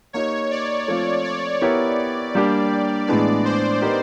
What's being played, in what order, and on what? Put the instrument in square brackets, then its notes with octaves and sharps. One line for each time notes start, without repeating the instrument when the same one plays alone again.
[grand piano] A#3 D#4 G4 [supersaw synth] C#5
[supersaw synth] D5
[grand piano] F3 A3 C4 F4
[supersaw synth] D5
[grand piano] B3 E4 G4 A#4 C#5
G3 A#3 D4 G4
[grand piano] A2 E3 G#3 B3 D4 [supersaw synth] D5
[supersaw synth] C5
[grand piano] B3 D#4 G4 A#4